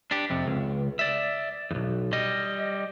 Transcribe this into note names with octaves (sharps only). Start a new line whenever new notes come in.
D4 G4
F2 C3
C#2
D5 E5
B1 E2
G3 D#5